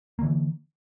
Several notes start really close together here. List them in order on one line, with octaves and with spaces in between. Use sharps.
A#3 D3 E3